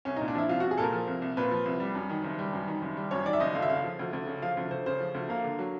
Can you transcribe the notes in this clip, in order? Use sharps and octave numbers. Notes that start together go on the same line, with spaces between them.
C2 C#4
A#2 D#4
D4
F3 E4
C2 F4
C2 F#4
G#4
A#2 A4 A#4
F3
C2
C2
A#2 B4
F3
C2
G3
F#2
D#3
F#1
G3
F#2
D#3
F#1
G3
F#2 C#5
D#3 D5
E5
F#1 D#5
D2 F5
E5
C#3 F5
F3
D2
D2
C#3
F3 F5
D2
D2 C5
C#3 C5
F3
D2
A#3 F5
D3
F#3